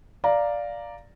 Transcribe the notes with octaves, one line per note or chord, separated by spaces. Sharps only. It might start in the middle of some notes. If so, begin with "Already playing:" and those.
D5 F5 A#5